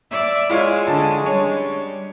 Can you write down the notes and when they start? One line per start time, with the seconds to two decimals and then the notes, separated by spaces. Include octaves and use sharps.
0.11 D5 E5
0.50 G#3 E4 F4 C#5
0.87 D3 C#4 A5
1.26 G3 D4 C#5